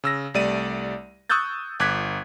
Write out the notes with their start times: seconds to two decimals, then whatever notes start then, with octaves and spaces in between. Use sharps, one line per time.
0.04 C#3 E6 A#6
0.34 C2 G3 A3 D5 D#7
1.30 C#6 D#6 E6 F#6 G6 A6
1.80 G1 D6 F#6 G#6 B6